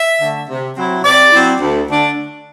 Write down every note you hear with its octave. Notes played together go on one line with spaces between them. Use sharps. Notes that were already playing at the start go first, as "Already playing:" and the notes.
Already playing: E5
D3 A3
C3
F#3 C4 E4
C3 D5
F#3 C4 E4
D2
D3 A3 D4